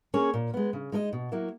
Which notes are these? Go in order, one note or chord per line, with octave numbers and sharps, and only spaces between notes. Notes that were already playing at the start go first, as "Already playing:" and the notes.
A#3 C#4 G#4 C#5
A#2
G#3 B3
C#3
G#3 D#4 A#4 D#5
B2
F#3 A#3 E4